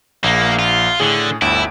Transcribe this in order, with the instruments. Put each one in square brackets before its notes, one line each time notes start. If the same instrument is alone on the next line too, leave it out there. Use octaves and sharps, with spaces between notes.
[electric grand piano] A#1 [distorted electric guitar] A#3
[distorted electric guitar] F4
[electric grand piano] A2 G#4 [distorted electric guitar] D3
[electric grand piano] G1 D2 D7 [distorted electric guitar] E4